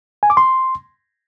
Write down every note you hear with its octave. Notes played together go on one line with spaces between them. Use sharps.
G#5
D6
C6